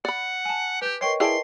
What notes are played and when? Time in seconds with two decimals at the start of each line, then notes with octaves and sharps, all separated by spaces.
0.05 D5 F#5 B5
0.45 G#5 A5
0.82 G4 B4 G6
1.01 A#4 B4 C#5 D#5 G5 C6 C#6
1.20 E4 G#4 D5 G5 A5 C6 D7